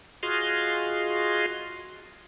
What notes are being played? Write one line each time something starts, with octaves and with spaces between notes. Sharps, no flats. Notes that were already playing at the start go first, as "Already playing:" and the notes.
F4 F#4 G#4 D#5 F5 C6